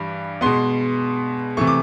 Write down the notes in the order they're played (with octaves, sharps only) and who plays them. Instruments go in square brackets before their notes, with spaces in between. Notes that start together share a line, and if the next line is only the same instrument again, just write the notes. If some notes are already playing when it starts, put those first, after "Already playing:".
Already playing: [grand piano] G2 E3 G3
B2 G#3 B3 C6
C3 E3 A3 C#6
D6